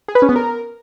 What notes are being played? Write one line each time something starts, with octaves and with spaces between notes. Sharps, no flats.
G#4
B4
C#4
B3
A#4